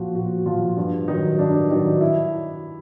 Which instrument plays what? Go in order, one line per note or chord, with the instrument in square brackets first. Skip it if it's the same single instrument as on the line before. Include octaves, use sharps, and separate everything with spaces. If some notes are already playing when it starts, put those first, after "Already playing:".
Already playing: [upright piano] A#2 F3 F4 F#4
A#2 F#4
F3 F4
G2 F4
D#3 F#3 D#4
G2 D4
D#3 F#3 D#4
E4